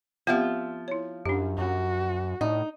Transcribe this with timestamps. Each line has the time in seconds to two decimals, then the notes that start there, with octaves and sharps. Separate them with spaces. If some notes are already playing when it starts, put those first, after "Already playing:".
0.27 F3 B3 C4 F4 G4 E5
0.88 E4 C#5
1.26 F#2 D4 G4
1.58 F#2 F#4
2.41 A2 D#4